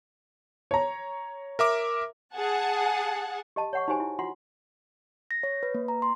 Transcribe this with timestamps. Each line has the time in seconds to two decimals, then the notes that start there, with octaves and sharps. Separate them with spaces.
0.71 C#5 A#5
1.59 A#4 E5 D6
2.36 G#4 F#5 A5
3.56 G4 D#5 A5
3.73 C#5 F#5 C#6
3.88 D#4 F#4 G4 C5 G#5
4.00 E4
4.19 F4 F#4 F#5 C6
5.31 A#6
5.43 C#5
5.63 B4
5.74 A#3
5.88 A#5
6.02 C6